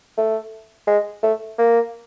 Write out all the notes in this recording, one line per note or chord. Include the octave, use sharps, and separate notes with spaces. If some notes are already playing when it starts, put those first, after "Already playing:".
A3
G#3
A3
A#3